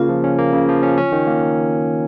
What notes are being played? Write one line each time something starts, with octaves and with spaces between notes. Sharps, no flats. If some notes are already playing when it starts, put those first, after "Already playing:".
Already playing: C#3 A#3 F4
F3
C#4
A#3
C#3
F3
C#4
C#4
D#3
A#3